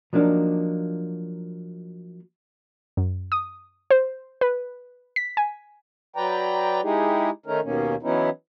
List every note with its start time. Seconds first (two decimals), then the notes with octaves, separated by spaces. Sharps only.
0.13 F3 F#3 A#3 D4 D#4
2.97 F#2
3.32 D#6
3.91 C5
4.41 B4
5.16 B6
5.37 G#5
6.16 F#3 B4 D5 G5 A#5
6.83 G#3 D#4 E4 G4 G#4
7.46 D#3 A3 C#4 D#4 A#4
7.63 D#2 B2 D#3 A#3 C#4
8.03 E3 F#3 B3 C#4 D#4 E4